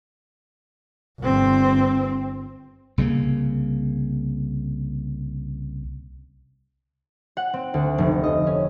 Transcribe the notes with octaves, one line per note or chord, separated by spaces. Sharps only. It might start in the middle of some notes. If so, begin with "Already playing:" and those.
G1 C4
C2 C#3 G3 A#3
F#5
C4
D2
F1
D#5
C#4